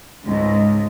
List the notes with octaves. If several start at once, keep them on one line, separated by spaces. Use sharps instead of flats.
C#2 G#2